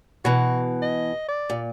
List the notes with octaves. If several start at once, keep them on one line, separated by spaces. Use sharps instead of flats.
B2 E3 F#4
D#5
D5
A#2